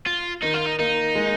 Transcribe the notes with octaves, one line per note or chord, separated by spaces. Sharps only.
F4
D#3 D#4
F4
D#4
A#3 D#4
G#3